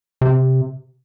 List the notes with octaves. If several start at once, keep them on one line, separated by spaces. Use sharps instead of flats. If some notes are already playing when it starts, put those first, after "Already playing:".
C3